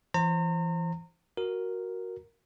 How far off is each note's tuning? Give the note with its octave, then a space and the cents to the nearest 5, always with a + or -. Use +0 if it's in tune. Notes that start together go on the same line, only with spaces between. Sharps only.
E3 +25 C5 +25 A#5 -35
F#4 +0 A#4 +0